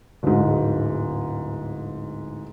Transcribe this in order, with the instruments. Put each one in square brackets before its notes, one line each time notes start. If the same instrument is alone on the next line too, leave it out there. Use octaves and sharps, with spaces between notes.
[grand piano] D1 G#2